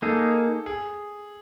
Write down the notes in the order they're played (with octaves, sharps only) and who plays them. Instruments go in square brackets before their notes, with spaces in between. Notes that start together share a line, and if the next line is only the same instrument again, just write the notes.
[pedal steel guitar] A#3 D#4 G#4 [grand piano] A4
[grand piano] G#4